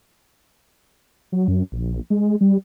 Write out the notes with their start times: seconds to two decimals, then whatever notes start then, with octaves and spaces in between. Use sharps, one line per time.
1.32 F#3
1.48 F#2
1.72 A#1
2.10 G#3
2.41 G3